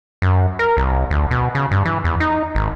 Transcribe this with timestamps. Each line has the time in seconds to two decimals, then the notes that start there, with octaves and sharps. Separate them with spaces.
0.22 F#2
0.59 A#4
0.77 C2
1.10 D2
1.31 B2
1.55 C#3
1.71 G2
1.85 E3
2.04 E2
2.20 D#4
2.55 G#1